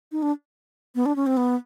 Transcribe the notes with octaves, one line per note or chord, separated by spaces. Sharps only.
D#4
D4
B3
D4
C#4
C4
B3